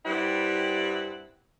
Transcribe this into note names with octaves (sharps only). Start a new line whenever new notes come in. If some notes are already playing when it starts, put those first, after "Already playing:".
G2 G3 C4 E4 F#5